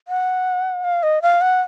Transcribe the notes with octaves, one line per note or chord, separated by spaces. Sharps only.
F#5
F5
D#5
F5
F#5